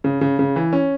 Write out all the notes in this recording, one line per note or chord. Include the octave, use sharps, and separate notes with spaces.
C#3
C#3
C#3
E3
C#4